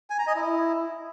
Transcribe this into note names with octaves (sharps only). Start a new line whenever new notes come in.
G#5
A#5
D#5
E4